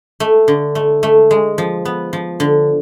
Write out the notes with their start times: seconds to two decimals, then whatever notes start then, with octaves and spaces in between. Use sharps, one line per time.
0.20 A3
0.48 D3
0.75 A3
1.03 A3
1.31 G#3
1.58 F3
1.85 B3
2.13 F3
2.40 D3